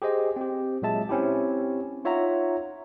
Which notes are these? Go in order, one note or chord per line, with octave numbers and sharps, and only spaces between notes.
G4 G#4 C5 D#5
C4 G4
A#2 F#3 G#3 E5 A5
C4 C#4 E4 G4
D#4 F4 C#5 E5 F#5 A#5